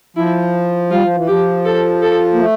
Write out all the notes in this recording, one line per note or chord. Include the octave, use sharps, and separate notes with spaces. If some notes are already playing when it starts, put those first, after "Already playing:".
F3 E4
G3 F4
F3
E3
F3 G4
A4
A4
A#3
A3